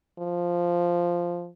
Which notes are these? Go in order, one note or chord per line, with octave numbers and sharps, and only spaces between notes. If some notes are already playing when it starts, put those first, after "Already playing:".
F3